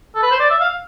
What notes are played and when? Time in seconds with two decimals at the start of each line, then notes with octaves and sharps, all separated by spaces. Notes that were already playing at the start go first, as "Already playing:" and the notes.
0.15 A4
0.23 B4
0.31 C5
0.40 D5
0.50 E5
0.60 F5